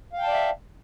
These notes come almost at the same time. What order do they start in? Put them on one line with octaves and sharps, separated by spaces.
F5 G5 A5 D5 E5